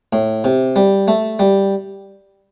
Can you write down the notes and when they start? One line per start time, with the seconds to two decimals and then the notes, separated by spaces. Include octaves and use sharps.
0.13 A2
0.44 C3
0.76 G3
1.08 A3
1.39 G3